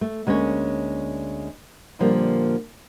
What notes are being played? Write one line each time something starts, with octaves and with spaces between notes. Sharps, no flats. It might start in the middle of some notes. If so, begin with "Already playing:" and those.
A3
D2 G#3 A#3 C#4 C#5
A#2 D3 F3 G3 A#3